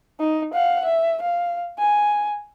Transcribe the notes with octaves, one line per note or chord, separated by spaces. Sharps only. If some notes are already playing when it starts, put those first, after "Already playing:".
D#4
F5 F#5
E5
F5
G#5